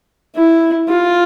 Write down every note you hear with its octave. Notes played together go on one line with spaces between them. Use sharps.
E4
F4